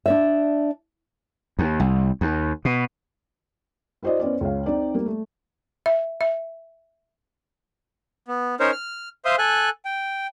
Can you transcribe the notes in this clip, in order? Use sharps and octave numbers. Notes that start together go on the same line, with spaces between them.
D4 D5 E5
D#2
C2
D#2
B2
E4 F#4 C5 D5 D#5
B3 C#4 C5 D5
C#2 C#5 F5
C4 D#4 D5
G3 A#3
A3
E5
E5
B3
C#4 D#4 A#4 C5 C#5
F6
C5 E5 F5 C6 D#6
A4 G#5 F#6
G5